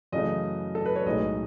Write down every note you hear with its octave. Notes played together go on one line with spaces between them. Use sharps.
F#2 C#3 E3 A3 E4 D#5
A4
B4
C#5
B1 A2 G#3 D#4 D#5